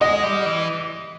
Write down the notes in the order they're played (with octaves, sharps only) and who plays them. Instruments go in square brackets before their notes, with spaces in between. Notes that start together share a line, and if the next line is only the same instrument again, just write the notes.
[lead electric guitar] G#3 [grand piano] D#5
[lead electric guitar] G3
E3